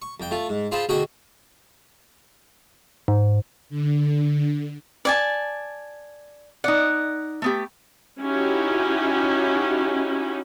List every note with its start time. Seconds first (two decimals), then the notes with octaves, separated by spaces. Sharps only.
0.02 C#6
0.20 F2 G5
0.31 A3 F4
0.49 G#2
0.71 C4 F4 G#4 C5 A5 B5
0.89 D2 B2 F#4 G#4 G5 D#6
3.08 G#2
3.70 D3
5.05 D5 G#5 A5
6.64 D#4 D5 F#5
7.42 A3 B3 G4
8.20 C#4 D#4 E4 F#4 G4